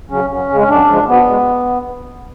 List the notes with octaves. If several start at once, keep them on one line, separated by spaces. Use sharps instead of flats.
C#3 F#3 C#4
F#2 C#4
C#3 G#3
C#4
F#2 D4
C#3 F3 G#3
B2 B3
G#3